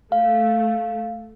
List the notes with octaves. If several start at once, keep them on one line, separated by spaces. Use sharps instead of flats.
A3 F5